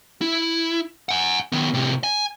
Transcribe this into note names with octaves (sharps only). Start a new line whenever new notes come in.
E4
F#5 G#5
D#3 B3
A2 C3
G#5